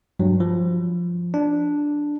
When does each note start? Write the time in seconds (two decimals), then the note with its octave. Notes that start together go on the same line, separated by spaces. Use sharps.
0.19 G2 F#3
0.40 F3
1.34 D4